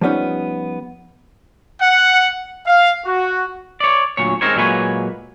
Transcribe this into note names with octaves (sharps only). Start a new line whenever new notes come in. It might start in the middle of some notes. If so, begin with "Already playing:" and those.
F3 G3 B3 C#4 D#4
F#5
F5
F#4
C#5 D5
D2 A#2 F#3 C#5
G#3 C4 D#4 A#4 C5 C#5
A#2 F#3 G#3 A#3 B4 C#5